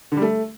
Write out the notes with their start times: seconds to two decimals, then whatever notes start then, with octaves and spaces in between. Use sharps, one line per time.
0.12 D3
0.17 G3
0.22 A3